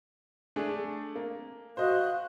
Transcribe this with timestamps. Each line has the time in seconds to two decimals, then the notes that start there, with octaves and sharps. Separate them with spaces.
0.56 A3 D4 G#4
1.15 A#3
1.77 F#4 C5 D#5 F5 F#6